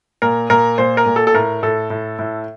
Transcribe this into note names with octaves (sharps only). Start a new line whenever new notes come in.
A#2 A#4
A#2 A#4
A#2 C5
A#4
A#2
A4
A4
A2 A#4
A2 A4
A2
A2